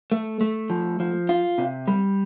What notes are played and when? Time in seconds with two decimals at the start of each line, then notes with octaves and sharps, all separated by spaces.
0.12 A3
0.41 A3
0.70 F3
1.00 F3
1.29 F4
1.58 C3
1.88 G3